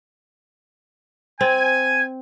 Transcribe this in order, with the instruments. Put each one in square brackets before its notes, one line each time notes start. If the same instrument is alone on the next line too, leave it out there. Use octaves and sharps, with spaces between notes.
[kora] C4 [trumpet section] G#5